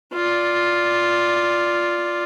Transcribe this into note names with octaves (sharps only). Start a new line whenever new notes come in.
F4 D5